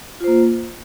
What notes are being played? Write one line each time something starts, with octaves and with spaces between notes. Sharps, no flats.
A#3 F4 C5